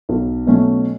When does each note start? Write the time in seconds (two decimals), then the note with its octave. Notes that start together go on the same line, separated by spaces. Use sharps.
0.09 B1
0.46 B2 F#3 A3 C#4